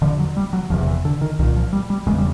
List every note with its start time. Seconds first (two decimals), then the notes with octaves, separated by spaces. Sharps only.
0.02 E1 D#2 D3 F3
0.19 F#3
0.37 G3
0.53 F#3
0.70 F1 E2 C3 F3
0.87 E3
1.05 D3
1.21 D#3
1.39 C2 D#3
1.43 A#2
1.56 F3
1.73 G3
1.90 G3
2.07 E1 E2 C#3 G#3
2.18 G3